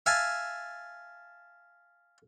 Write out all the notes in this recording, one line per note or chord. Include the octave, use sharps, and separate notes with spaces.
E5 F5 G#5 A5